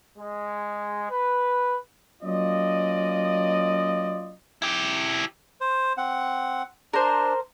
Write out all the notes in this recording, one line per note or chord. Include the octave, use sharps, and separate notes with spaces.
G#3
B4
F#3 A#3 C#4 F4 D5 D#5
E4 G4
C5
C4 F#5
D4 A#4 C5